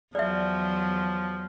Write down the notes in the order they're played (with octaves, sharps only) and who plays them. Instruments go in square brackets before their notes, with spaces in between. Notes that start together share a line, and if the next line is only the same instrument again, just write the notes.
[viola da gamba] E2 F#3 [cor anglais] F3 [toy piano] D5 E5